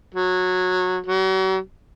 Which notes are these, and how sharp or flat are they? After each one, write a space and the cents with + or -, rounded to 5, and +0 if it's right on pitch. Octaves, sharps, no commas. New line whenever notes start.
F#3 -15
F#3 +40